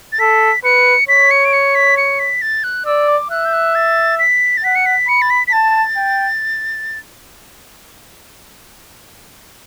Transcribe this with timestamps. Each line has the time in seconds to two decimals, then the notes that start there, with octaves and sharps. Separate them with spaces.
0.12 A6
0.19 A4 B6
0.64 B4 C#7
1.08 C#5 B6
1.31 C#7
1.45 D7
1.53 C#7
1.75 B6
1.97 C#7
2.19 B6
2.42 A6
2.64 F#6
2.86 D5 E6
3.08 D6
3.30 E5 F#6
3.45 G6
3.53 F#6
3.75 A6
4.19 B6
4.57 A6
4.64 F#5 B6
4.75 C#7
4.86 B6
5.08 B5 C#7
5.22 A6
5.30 B6
5.47 B6
5.52 A5 A6
5.97 G5